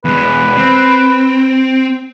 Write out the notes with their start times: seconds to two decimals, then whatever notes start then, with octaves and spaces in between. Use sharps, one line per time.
0.05 E2 G#3 B4
0.57 C4